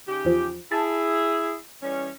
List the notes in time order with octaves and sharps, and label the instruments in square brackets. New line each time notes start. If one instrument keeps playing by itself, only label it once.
[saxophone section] C#3 D#4 G4
[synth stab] E2 F3
[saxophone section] E4 G#4 [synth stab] A5
[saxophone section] E3 G3 C#4